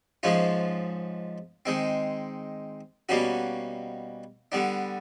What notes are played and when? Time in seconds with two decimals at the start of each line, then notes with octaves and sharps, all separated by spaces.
0.23 G#2 F3 G#3 C#4 F4
1.66 D#3 G#3 C4
3.09 B2 G3 A#3 C#4 F#4
4.52 D3 G3 B3 D4